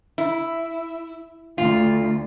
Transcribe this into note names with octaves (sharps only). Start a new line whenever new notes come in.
E4
D2 F4